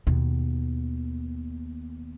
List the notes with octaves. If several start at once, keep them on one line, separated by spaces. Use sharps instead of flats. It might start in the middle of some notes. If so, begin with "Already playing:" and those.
D#2 B2